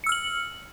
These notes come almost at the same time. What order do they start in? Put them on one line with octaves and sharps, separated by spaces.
C#7 E6 F6 F#7